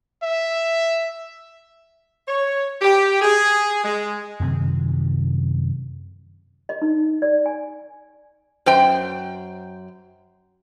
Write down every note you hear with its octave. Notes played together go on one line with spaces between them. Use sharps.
E5
C#5
G4
G#4
G#3
F#2 C3 D#3 C4
D#5
D#4
D5
G#5
F#2 C5 G5